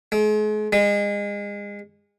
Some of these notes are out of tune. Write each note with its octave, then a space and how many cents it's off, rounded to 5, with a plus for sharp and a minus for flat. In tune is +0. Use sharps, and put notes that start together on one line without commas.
G#3 +40
G#3 -30